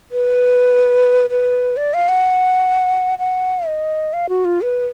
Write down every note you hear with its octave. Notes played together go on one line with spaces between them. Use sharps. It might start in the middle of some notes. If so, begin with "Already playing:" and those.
B4
B4
D5
F5
F#5
F#5
D#5
F5
F#4
F4
B4